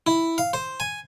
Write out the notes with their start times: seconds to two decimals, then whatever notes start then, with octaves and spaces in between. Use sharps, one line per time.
0.07 E4
0.38 F5
0.53 C5
0.80 G#5